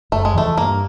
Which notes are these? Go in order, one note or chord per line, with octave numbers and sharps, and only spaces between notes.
F#1 A3
G#3
E2 C#3 F3 A3
G2 A#3